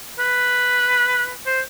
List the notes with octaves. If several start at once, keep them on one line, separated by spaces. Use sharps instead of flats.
B4
C5